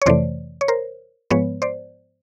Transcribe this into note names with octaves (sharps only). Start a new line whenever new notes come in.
C#5
F2 C3 E3 A3 C5 D5
C#5
A#4 C5
G#2 F3 G#3 B3 B4 C#5
C5 D5